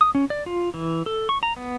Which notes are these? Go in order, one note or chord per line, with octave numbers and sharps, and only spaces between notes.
D#6
C#4
D5
F4
E3
A4
C#6
A#5
B3